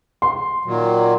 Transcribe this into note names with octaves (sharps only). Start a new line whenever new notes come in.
C6
A#2 D#3 F#3